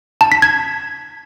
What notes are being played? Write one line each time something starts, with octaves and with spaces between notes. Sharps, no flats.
A5
B6
G#6